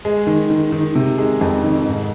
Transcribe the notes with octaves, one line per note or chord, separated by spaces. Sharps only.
G#3
D#3
D#3
D#3
C3
G#3
F2
D#3
G#2